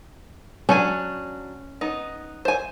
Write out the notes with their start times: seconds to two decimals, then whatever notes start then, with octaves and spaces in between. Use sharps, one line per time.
0.69 F#3 C#4 D4 G#5
1.81 B3 D#4
2.45 C5 G#5